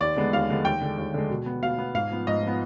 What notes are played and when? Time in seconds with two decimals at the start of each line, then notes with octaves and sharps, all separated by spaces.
0.01 D#2 D5
0.16 D3 G#3 B3
0.33 D#2 F5
0.50 D3 G#3 B3
0.65 D#2 G5
0.81 D3 G#3
0.98 D#2
1.14 D3 G#3
1.30 B2
1.46 B3
1.62 B2 F5
1.79 B3
1.95 G#2 F5
2.11 F3 B3
2.27 G#2 D#5
2.43 F3 B3